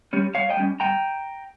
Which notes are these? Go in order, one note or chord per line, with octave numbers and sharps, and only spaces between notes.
G3 C#4
G2 C#5 F5
D#5 G5
G3 C#4
G2 G5 A#5